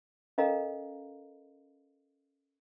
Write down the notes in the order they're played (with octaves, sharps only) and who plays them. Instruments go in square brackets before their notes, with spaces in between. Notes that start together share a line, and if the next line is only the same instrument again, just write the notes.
[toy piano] C#4 A4 A#4 D#5 F5 A#5